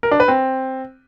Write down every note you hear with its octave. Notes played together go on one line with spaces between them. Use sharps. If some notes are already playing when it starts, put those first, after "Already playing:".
A#4
D4
B4
C4